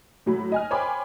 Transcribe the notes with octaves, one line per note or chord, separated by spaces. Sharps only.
A2 F#3 B5
D#5 G#5 F6
C5 C#5 G5 G#5 B5 D6